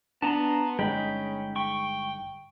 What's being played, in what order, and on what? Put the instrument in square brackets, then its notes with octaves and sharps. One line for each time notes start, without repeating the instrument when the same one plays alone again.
[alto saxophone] B3 [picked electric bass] D4 [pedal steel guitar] A5 A#5 C6
[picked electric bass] G1 [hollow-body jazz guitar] G#3 D#4 [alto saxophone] C#4 [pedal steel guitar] G5 B5
[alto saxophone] G5 [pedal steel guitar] C#6